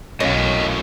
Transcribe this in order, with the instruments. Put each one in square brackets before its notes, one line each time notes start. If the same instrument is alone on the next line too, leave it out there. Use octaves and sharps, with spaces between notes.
[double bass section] B1 [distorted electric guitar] F#2 A2 [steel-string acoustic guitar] C#4 [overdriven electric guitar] D#5 F5